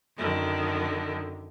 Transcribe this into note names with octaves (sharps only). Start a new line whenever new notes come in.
F#2 D3 D#3